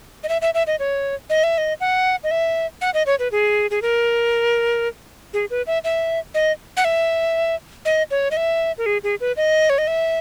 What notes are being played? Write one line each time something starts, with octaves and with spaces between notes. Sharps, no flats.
D#5
E5
E5
E5
D#5
C#5
D#5
E5
D#5
F#5
D#5
E5
F#5
D#5
C#5
B4
G#4
G#4
A#4
G#4
B4
E5
E5
D#5
F#5
E5
D#5
C#5
D#5
E5
A#4
G#4
G#4
B4
D#5
C#5
D#5
E5